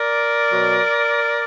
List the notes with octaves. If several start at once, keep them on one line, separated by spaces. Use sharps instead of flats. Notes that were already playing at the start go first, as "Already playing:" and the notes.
Already playing: A#4 D5
B2 F#3